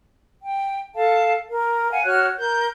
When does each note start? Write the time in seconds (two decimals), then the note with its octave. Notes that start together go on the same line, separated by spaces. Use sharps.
0.41 G5
0.95 A4 F5 A5
1.49 A#4
1.91 F5 F#5 G#5
2.05 F#4 C#5 F6 F#6
2.38 A#4 G6